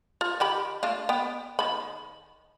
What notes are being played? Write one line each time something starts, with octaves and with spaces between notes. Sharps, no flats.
F4 A#5
D#3 G4 B5
A3 D4 F4
B3 G5
D#3 B5